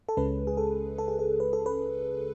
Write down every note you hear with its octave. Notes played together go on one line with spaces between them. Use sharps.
A4
C#2 C#3 G#3 C#4 B4
G#4
A4
A4
G#4
A4
B4
A4
B4